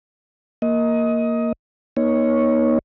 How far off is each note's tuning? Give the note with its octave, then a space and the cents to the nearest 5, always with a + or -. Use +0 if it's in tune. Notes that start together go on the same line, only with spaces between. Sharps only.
A#3 +0 D#5 +20
A#3 +45 D#4 +0 C#5 +0